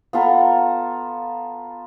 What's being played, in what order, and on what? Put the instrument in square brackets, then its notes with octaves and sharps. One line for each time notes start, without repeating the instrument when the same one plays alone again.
[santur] B3 F4 A4 A#5